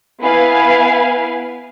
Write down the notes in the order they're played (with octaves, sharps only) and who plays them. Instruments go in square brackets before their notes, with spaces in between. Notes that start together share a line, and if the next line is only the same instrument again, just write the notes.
[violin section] B3 E4 B4 F5 G#5